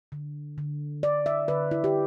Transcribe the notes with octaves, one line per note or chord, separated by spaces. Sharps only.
D3
D3
D3 D5
E5
D3 B4
E4
G4